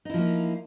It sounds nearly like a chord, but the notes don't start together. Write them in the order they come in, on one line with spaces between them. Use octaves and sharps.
D#4 E4 F3 A#3